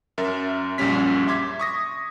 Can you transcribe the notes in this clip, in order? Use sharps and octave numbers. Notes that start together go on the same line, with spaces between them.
F#2 A#4 E5 A6
A#1 F#2 A#2 G3 C#4 B6
E5 C6 D6 G#6 B6
C#6 D#6 A#6